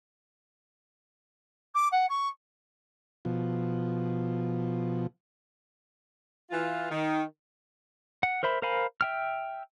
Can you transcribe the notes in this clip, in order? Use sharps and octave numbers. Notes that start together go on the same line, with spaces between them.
D6
F#5
C#6
B2 F3
E3 F4
D#3
F#5
A#4 C5 E5 B5
A#4 C5 F5 G#5 B5
E5 G5 F6